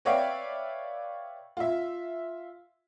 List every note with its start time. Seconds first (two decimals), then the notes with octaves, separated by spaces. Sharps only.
0.05 B4 C#5 D5 E5 F5 G5
1.57 F4 E5